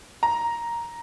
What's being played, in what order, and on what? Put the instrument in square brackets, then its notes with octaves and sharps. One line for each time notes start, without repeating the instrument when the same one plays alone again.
[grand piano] A#5